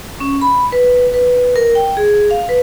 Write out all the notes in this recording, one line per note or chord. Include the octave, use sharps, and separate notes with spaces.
C#4
B5
B4
B4
A#4
G5
G#4
F5
B4